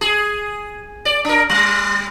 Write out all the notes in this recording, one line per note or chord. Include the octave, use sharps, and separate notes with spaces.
G#4
D5
D4 A#4
G3